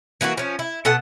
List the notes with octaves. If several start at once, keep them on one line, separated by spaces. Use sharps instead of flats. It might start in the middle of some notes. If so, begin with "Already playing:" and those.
E3 A#3 E4 F#4
F3 C#4
E4
B2 A4 F#5 A5